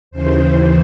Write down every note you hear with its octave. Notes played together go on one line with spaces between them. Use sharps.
D#2 C#3 E3 C5